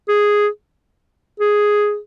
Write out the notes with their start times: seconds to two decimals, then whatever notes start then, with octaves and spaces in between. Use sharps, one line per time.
0.09 G#4
1.40 G#4